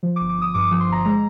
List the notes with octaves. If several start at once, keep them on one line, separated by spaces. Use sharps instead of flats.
F3
D6
G1
D6
G1 D#6
G2 D6
F3 D6
C6
G1 A#5
G#3 A#5